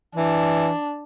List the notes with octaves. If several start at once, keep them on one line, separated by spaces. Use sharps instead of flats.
E3 D4